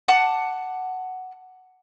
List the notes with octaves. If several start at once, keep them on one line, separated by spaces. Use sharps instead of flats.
F#5 A5 D6